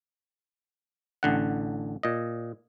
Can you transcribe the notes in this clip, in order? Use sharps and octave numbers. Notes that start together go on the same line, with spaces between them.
A1 D3 F#5
A#2 D#5